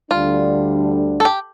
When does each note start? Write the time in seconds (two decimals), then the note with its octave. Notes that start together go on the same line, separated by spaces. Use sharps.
0.11 D2 D3 G3 D4 F4
1.20 A4
1.25 G4